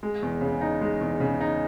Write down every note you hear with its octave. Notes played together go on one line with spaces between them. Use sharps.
G#3
E2
C#3
D#4
G#3
E2
C#3
D#4